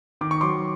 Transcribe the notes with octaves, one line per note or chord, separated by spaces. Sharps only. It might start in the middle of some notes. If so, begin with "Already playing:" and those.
D#3 D6
C#6
F#3 C6 D6